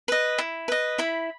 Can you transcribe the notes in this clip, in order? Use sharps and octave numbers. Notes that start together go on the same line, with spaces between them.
B4 D#5
E4
B4 D#5
E4 B5